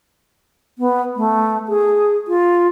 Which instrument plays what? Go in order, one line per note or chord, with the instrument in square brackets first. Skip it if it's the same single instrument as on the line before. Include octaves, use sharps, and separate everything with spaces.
[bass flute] B3
A3
G#4
F4